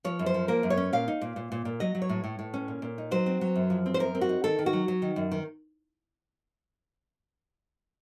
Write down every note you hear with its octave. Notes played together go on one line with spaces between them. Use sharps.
F3 C#5
F#2
C5
F3
A#3 A#4
F#2
C#5
C#4
A#2 F5
D#4
A#2
A#2
A#2
A#2
F#3 D#5
F#3
C#5
A2
A2
A2
C#4
A#2
A#2
D#4
F#3 C5
C4
F#3
F#2
F3
C4
C5
F#2 A#4
C4
F#4
D#4
D#3 A4
D#3
F#4
F#3
F#3
D#3
F#2
D#3